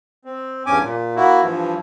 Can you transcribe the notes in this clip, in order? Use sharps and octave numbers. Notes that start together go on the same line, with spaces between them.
C4
E2 G2 C#4 G#5 D6
A#2
A#3 E4 F#4
G2 E3 F3